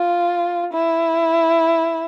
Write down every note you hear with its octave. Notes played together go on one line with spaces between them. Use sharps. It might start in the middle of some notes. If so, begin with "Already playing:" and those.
Already playing: F4
E4